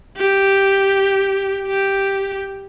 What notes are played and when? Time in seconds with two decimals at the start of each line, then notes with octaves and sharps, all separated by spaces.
0.17 G4
1.67 G4